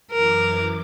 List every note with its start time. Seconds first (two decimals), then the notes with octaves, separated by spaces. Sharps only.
0.12 F#2 E3 A#4 D6